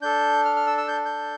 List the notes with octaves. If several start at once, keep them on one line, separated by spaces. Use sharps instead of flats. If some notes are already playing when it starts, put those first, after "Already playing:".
D4 A4 G6
F6
F6
E6
E6
G6
G6